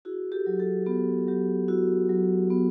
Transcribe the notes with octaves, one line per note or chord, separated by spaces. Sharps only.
E4 F#4 G#4
G4 A4
F#3
G4 A4
B3 G4
F#3 G4
E4 F#4
F#3
B3